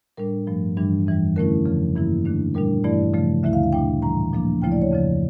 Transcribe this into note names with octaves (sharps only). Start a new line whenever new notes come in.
A2 G3 D4 A#4
G2 F3 A3
G2 E3 G3 D4
F2 E3 G3
D3 A3 C#4 E4 A#4
F2 C#3 F3
G2 E3 A#3 E4
D3 A3 D4
A#2 G3 D4 A#4
G2 E3 A3 E4 D5
C#3 F3 A3
D2 D3 A3 E4 E5
F5
F5
A#2 A3 D4 G5
A2 E3 G3 A#5
A#2 F3 A#3 D4
D2 C#3 F3 A3 E4 G5
D5
C#5
F2 C#3 F3